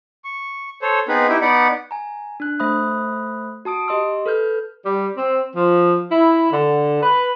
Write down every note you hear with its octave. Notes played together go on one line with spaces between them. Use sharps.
C#6
A4 C5 C#5
B3 C4 D#4 G#4 B4 B5
D#4 E4 G4 E5
B3 D#4 D5 F#5 B5
G#5 A#5
D4 F#6
A3 C5 E5 B5 D#6 F#6
F#4 A5 D#6 D7
G4 D#5 C6 E6
A4 B4 F6 G6
G3
C4
F3
E4
D3
B4